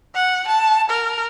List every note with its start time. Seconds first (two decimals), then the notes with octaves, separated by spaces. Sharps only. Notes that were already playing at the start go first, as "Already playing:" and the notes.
0.15 F#5
0.47 A5
0.90 A#4